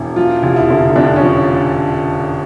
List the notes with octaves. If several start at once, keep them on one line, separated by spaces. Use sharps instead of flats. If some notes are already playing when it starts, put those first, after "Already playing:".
Already playing: E1 E3
F3 F4
F1
E4
D3
F2 D4
C#4
F3